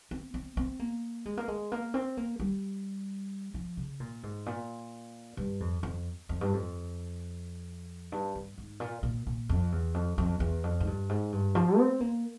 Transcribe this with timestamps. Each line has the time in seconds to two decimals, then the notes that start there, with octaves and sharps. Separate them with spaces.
0.11 C4
0.34 C4
0.57 C4
0.79 A#3
1.26 G#3
1.37 A#3
1.48 G#3
1.72 A#3
1.94 C4
2.17 A#3
2.40 G3
3.54 F3
3.77 C#3
4.00 A#2
4.23 G#2
4.46 A#2
5.37 G2
5.60 F2
5.83 F2
6.29 F2
6.41 G2
6.53 F2
8.12 G2
8.35 G2
8.58 G#2
8.80 A#2
9.03 A#2
9.27 A#2
9.49 F2
9.72 E2
9.94 F2
10.18 F2
10.40 E2
10.64 F2
10.80 G#2
10.87 G2
11.09 G#2
11.32 G2
11.55 F3
11.78 C4
12.00 A#3